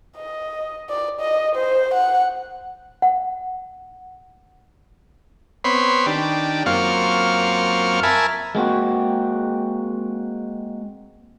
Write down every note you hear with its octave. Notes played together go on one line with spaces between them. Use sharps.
D#5
D5
D#5
C5
F#5
F#5
B3 C4 C#5 B5 C6
D#3 D4 G4
F#2 A#3 C4 F4 F5 C#6
A#4 E5 G#5 A5 B5
G#3 A#3 C4 F#4